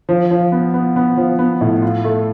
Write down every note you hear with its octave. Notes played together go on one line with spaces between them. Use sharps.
F3
F3
B3
B3
B3
F3
B3
A2
F4
A3